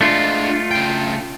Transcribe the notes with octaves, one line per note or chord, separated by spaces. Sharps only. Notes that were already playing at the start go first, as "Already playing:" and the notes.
G#3 A3 D4 F4
C#3 G5